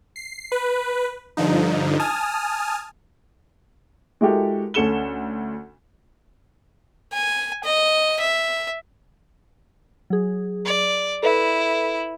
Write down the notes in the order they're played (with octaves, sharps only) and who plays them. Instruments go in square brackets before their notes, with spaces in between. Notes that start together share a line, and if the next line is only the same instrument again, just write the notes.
[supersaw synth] C7
B4
G2 D3 F3 D#4
G#5 A5 D#6 F6
[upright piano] G#3 E4 F#4 G4 A4 A#4
D2 C#4 A4 C#7 E7 G7
[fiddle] G#5
D#5
E5
[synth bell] F#3 G#4
[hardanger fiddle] D5
[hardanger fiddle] E4 [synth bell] A4 B4 E5